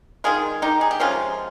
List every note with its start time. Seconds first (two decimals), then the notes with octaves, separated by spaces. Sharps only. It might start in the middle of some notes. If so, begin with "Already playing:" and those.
0.24 D#3 G#3 F4 G#4
0.62 D#4 G4
0.81 G#4
0.91 G4
1.00 C3 F3 G#3 C#4 F4